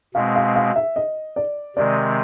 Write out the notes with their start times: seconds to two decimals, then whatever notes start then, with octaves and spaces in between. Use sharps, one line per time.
0.15 B2 G#3 C4 F5
0.36 F5
0.56 F5
0.76 E5
0.96 D#5
1.36 D5
1.76 C3 D#3 G#3 C4 D5